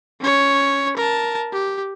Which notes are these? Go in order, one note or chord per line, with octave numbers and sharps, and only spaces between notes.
C#4 C#5
A#4 A5
G4